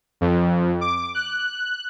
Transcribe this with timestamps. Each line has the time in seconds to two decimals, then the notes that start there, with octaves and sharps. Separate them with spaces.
0.21 F2
0.81 D6
1.15 F#6